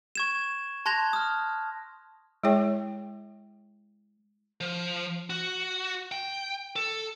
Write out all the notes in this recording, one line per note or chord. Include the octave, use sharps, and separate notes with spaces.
C#6 G#6 E7
A5 C6 F#6 G#6 A#6 F7
D#6 F6
G#3 E4 G#4 C#5 G5
F3
F#4
G5
A4